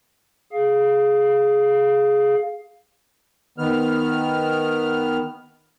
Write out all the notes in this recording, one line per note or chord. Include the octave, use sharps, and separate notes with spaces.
G#4 F5
D#3 B3 F6